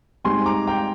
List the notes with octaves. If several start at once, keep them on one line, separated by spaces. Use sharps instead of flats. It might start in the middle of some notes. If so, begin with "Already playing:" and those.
G#2 G3 C4 G#5 C6
A#5 D6
G5 A#5